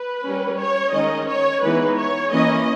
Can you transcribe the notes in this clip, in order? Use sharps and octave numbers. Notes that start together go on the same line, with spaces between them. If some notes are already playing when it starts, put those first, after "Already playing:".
Already playing: B4
G3 C#4
C#5
D#3 G#3 C#4 D#5
C#5
E3 G#3 B3 D#4 B4
C#5
E3 A#3 C#4 D#5